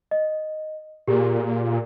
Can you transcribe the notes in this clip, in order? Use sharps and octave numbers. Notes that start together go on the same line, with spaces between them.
D#5
A#2 G4 G#4